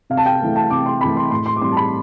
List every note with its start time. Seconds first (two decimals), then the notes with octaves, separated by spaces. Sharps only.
0.10 C3 F5
0.17 A5
0.26 G5
0.40 E3 A3 C4 A5
0.56 A5
0.70 C3 D6
0.86 C6
1.01 E3 A3 C4 B5
1.17 C6
1.31 A2 C6
1.46 C6
1.56 D6
1.61 E3 G3 C4 C6
1.72 A5
1.77 B5